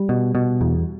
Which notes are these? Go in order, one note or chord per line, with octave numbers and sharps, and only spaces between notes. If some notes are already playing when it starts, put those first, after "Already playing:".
Already playing: G3
B2
B2
E2